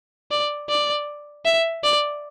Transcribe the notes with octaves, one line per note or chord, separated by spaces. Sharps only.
D5
D5
E5
D5